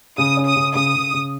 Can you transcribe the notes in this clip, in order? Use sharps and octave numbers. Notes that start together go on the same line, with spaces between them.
C#3 D#6
C#4
D#6
C#3
C#3 D#6
C#3
C#3